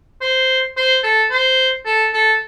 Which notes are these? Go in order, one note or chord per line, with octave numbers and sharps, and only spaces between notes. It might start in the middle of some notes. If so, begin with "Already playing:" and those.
C5
C5
A4
C5
A4
A4